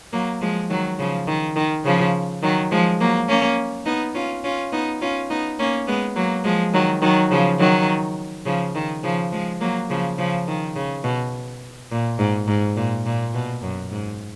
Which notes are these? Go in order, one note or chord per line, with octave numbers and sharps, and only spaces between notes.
F#3 A#3
F3 G#3
D#3 F#3
C#3 F3
D#3
D#3
C#3 F3
D#3 F#3
F3 G#3
F#3 A#3
A#3 C#4
B3 D#4
C#4 F4
C#4 F4
B3 D#4
C#4 F4
B3 D#4
A#3 C#4
G#3 B3
F#3 A#3
F3 G#3
D#3 F#3
D#3 F#3
C#3 F3
D#3 F#3
C#3 F3
D#3
C#3 F3
F3 G#3
F#3 A#3
C#3 F3
C#3 F3
D#3
C#3
B2
A#2
G#2
G#2
A#2
A#2
B2
F#2
G#2